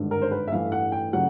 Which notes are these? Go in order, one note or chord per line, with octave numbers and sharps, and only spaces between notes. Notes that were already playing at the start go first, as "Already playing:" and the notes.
Already playing: G#1 G2 D3
A#4
C5
B4
E5
A1 G2 E3 A3 F5
F#5
G5
C#3 F#3 A3 F#5